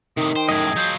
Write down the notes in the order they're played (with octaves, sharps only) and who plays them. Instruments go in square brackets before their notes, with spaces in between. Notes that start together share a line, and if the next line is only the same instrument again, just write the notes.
[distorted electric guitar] A2 C3 [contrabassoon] D#3 [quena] D#6
[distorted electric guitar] C5 [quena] G5
[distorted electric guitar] F#2 A2 [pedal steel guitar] G#4 D#5
[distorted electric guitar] F#3 F4 [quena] G6